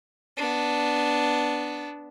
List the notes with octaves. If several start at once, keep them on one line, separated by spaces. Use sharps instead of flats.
B3 D4